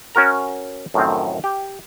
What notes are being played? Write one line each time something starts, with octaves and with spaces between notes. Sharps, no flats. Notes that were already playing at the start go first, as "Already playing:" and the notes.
C#4 F#4 A#4 A#5
F#2 A2 D#3 F3 C4
G4